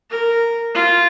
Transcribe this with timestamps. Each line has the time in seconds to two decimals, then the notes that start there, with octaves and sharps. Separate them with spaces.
0.11 A#4
0.75 F4